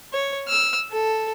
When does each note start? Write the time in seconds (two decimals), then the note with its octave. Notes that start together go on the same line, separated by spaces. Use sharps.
0.13 C#5
0.48 E6 F6
0.91 A4